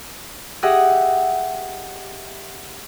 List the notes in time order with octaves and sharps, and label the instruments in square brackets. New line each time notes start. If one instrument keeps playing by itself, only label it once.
[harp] G4 G#4 D#5 E5 F#5